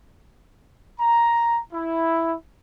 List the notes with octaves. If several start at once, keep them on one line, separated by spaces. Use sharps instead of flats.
A#5
E4